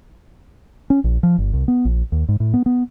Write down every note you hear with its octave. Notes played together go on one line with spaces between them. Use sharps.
C#4
A#1
F3
G1
C2
B3
A#1
D#2
G#2
A2
B3
B3